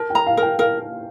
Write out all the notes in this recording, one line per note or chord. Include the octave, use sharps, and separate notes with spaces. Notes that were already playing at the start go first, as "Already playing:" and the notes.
Already playing: A#4 A5
G5
A#5
F5
A#4 G5
A#4 F5